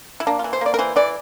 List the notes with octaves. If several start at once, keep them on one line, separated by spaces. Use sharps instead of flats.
E4
A#3 D4
F4
E3
C5
A#3 D5
A#4
E3 C5
E3 D5